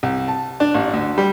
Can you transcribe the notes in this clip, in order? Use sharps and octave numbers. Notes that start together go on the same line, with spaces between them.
C2
A5
D4
A1
D2
G3